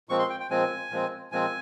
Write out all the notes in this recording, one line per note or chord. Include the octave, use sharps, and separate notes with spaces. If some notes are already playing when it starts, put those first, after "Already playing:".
A#2 F3 G#3 C4 C#6
C6
G5
G5
A#2 F3 G#3 C4 G#5
A#2 F3 G#3 C4
A#2 F3 G#3 C4 G#5